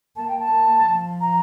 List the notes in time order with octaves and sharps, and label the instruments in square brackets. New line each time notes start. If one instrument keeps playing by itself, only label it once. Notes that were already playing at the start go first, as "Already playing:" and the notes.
[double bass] A#3 [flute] A5
[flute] G5
A5
[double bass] A#3
F3
[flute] A#5